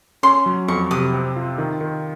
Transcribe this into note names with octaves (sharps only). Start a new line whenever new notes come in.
C#4 C6
F#3
F2 C#6
C3 D#6
C4
F4
D#3
D#3